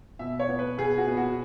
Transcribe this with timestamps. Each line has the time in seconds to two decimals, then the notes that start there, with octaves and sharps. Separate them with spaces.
0.19 B2 E5
0.39 C#5
0.49 B3
0.59 B4
0.78 B2 G#4
0.97 F#4
1.07 B3
1.17 F#4